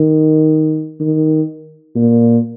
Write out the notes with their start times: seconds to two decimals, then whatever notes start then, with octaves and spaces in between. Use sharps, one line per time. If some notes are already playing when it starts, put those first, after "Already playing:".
Already playing: D#3
1.00 D#3
1.95 A#2